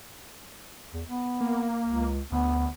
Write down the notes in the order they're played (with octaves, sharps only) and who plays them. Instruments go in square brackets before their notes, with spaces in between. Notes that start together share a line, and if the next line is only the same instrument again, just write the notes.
[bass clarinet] E2
B3
[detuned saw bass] A#3
[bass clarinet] C#2
[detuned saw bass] D2 [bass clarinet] B3